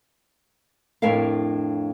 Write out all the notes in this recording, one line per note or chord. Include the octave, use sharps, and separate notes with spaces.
F2 A2 D4 E4 A#4 F5